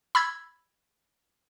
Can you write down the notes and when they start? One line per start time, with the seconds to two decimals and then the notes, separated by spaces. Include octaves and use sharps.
0.15 B5 E6 G#6